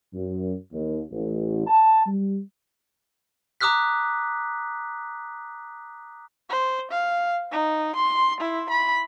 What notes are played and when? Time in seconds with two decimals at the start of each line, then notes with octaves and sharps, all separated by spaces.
0.14 F#2
0.73 D#2
1.11 A1
1.67 A5
2.06 G3
3.61 A#5 D6 D#6 F6 F#6 B6
6.50 C5
6.91 F5
7.52 D#4
7.96 C6
8.40 E4
8.70 B5